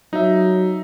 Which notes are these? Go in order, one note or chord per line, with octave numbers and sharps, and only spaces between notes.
F#3 D#4 E5